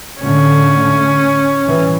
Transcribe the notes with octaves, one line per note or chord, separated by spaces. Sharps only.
A2 D3 A3 C#4
A2 E3 G3